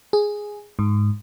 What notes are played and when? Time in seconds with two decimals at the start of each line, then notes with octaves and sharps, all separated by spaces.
0.13 G#4
0.79 G#2